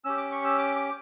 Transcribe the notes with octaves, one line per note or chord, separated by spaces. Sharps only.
C#4 G4 E6
D6
C#6
E6
D6
D6